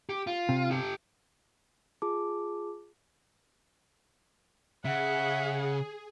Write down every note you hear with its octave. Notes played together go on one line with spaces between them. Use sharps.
G4
F4
C3
G4 A4
F4 G#4 A5 D6
C#3 G#4 E5 F#5